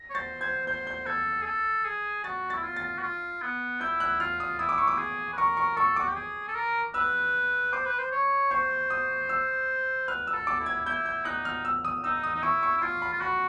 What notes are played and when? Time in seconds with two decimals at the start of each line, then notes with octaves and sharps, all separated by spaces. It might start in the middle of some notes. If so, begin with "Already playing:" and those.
Already playing: A#6
0.10 C#5
0.15 C5 A6
0.41 C5 G#6
0.67 C5 G6
0.87 G6
1.06 A4 G#6
1.42 G#4
1.46 A4
1.85 G#4
2.24 F#4 A6
2.50 E4 A6
2.63 F4
2.76 A6
2.99 F#4
3.03 F4
3.42 B3
3.81 E4 G6
4.00 F#6
4.20 F4 F6
4.40 D#6
4.59 E4 D#6
4.69 D6
4.78 C#6
4.87 D6
4.98 G#4
5.33 B4
5.37 A#4 C#6
5.57 C#6
5.77 A4 C#6
5.96 F#4 D6
6.07 G4
6.16 G#4
6.49 A4
6.55 A#4
6.94 B4 E6
7.73 C5 D6
7.86 B4
7.99 C5
8.12 C#5
8.51 C5 C#6
8.90 D#6
9.29 E6
10.08 B4 F6
10.27 E6
10.34 A4
10.47 D6
10.60 E4
10.66 G#6
10.86 E4 G6
11.06 G6
11.25 D#4 F#6
11.45 F6
11.65 E6
11.85 D#6
12.04 D#4 E6
12.24 D#6
12.35 D#4
12.43 E4 C#6
12.63 C#6
12.77 E4
12.82 F4 C6
13.02 B5
13.13 F4
13.21 F#4 B5